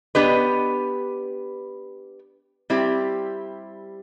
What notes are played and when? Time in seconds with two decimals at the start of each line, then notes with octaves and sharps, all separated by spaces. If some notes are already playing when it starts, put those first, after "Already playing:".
0.15 B3 D4 G4 B4 D#5
2.70 G3 C4 E4 G4